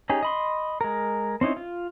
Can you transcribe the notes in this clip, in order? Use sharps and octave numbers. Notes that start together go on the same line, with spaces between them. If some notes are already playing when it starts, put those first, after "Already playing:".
C#4 D#4 G4 G#4
D#5 B5 C6
G#3 A#4
C4 C#4 D#4 E4
F4